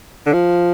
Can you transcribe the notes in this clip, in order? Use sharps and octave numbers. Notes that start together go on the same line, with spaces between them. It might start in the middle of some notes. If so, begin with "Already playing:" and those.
D3
F3